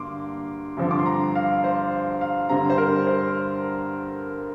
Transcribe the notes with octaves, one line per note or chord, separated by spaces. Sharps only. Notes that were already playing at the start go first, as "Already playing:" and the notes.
Already playing: G2 D3 A#3 C6 D6
G2 D3 F3 C4
D6
C6
A#5
F5
C5
F5
G2 D3 G3 C4 A#5
C5
A#4
C5